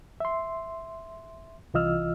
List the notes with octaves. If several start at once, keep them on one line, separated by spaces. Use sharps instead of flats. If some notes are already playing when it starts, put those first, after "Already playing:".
E5 C6
C2 E3 F4 D#5 E6 F6